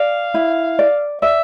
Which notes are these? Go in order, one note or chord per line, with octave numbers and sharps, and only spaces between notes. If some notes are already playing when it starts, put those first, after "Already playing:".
Already playing: D5 F5
E4
D5
D5 E5